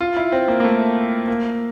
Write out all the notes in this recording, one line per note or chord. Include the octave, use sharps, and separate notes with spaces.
F4
E4
C4
A#3
A#3
A3
A#3